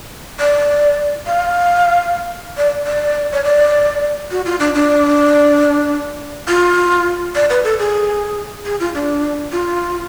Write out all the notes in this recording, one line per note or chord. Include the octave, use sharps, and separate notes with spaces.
D5
F5
D5
D5
C#5
D5
F#4
F4
D4
D4
F4
D5
B4
A4
G#4
G#4
F4
D4
F4